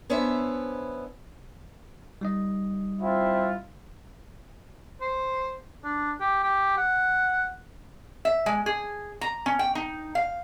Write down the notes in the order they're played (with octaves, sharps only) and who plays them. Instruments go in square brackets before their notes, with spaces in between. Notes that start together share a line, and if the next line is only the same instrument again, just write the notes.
[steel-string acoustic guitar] B3 C#4 D4 E4 C5 E5
[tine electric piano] G3 D#4 D#5
[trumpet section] C4 E4 F4
[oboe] C5
D4
G4
G4
F#5
[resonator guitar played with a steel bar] E5
G#3
G#4
A#5
C#4
G5
D#4
F5